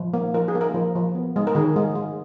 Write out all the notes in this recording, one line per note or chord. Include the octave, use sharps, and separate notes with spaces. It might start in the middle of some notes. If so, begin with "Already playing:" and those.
Already playing: F3
A#3
F3 A#4
G#4
A#3
A#4
F3
F3
B3
G#3
A#4
D#3 G#4
G#3
G#3